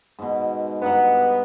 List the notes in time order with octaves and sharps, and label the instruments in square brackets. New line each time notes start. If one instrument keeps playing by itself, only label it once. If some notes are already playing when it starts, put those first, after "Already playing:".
[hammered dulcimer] G#2 B2
[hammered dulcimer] G2 D#4 F#5 [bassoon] B3